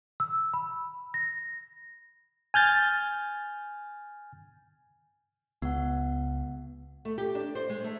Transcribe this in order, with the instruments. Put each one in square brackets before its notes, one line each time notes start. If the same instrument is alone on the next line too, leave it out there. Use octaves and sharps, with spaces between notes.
[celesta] E6
B5
A#6
[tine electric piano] G#5 F6 G6 A6
[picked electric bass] C#2 [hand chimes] B3 F#5
[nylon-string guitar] A3
G4
D4
C5
G#3
A3